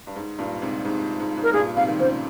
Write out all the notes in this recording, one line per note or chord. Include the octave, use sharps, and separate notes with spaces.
G2
G#2
G2 A#2
G#2 C3
G#2 C3
G#2
G#2
A#4
G2 A#2 G#4
G#2 C3 F5
D#3
A#2 C#3 C5